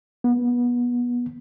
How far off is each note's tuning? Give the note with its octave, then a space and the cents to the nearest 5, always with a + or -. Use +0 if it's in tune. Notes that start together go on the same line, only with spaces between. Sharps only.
B3 -25